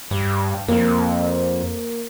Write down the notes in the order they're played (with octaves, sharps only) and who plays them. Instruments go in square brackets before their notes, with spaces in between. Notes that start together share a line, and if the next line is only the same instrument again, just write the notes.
[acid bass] G2
[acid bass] F2 [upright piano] A#3